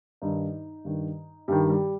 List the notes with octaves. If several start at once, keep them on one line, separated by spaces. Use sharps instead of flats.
G2 D#3 D#4
G2 D#3
G2 D#3 G3
G3